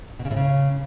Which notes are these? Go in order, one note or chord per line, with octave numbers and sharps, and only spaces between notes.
B2
C#3
A2
C#3